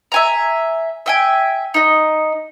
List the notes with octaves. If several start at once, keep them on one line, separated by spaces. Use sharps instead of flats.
E5 G#5 A#5
E5 G5 G#5
D#4 D#5